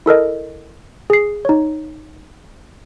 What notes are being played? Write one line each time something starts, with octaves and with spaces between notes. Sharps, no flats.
E4 A4 A#4 D#5
G#4 C7
D#4 C#5